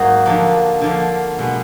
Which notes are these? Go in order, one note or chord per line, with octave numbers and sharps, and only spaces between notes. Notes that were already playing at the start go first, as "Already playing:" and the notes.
Already playing: G#2 F#3 A#3 D#4 F#4
D3 F3 A#3
D3 F3 A#3
B2 G#3 B3